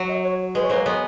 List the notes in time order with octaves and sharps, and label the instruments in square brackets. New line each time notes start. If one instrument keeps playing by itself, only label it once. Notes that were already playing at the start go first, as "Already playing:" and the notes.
Already playing: [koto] F#3
[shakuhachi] D#5
C#5
[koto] G#3 [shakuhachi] B4
[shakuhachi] C#5
[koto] F#3 A#3 [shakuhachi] B4
[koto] G#3 B3 [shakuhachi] C#5